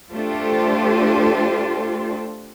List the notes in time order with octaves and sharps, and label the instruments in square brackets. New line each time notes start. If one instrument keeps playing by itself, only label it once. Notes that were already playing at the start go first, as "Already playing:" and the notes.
[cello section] A3 D4 F4 G4 A4 C5